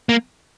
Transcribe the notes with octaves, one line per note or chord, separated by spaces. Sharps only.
A#3